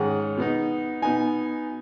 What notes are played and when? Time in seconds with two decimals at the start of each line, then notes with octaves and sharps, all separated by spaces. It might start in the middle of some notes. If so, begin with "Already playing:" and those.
Already playing: G#2 D#3 G#3 C#4 F#5
0.37 B2 B3 D#4
1.02 B2 B3 D#4 G#5